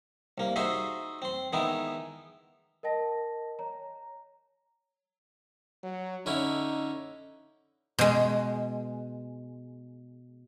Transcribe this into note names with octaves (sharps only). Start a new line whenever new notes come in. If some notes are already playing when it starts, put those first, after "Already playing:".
C2 A#3
D#4 F#4 G#4 C5 D#5 E5
C4 C6
D#3 G#3 B3 D#4 E4
A#4 D#5 G5 A5 A#6
C#5 A#5
F#3
D3 C#4 D#4 E4
B2 G#3